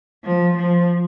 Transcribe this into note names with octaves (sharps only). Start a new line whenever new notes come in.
F3
F3